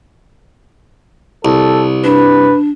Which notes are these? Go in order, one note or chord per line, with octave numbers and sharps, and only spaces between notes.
C2 A4
D4 B4